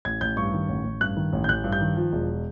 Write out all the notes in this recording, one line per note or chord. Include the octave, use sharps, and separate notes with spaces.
A1 G#6
A1 G6
G2 C#6
D#3
A1
A1
G2 F#6
D#3
A1
G6
A1 F#6
G2
G6
D#3
F3
E1